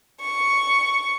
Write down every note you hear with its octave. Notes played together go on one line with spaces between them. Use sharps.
C#6